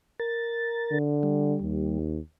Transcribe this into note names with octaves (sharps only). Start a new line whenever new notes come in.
A#4 A6
D3
G3
D#2